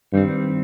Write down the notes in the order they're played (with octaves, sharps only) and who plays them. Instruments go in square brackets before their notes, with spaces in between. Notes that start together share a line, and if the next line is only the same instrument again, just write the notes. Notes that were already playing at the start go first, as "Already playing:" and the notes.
[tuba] G2 [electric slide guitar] D#3 G3 C4